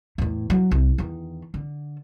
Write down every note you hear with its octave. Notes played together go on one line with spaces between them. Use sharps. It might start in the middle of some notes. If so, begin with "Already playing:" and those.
E2 A2
F#3
C2
E2 D#3
D3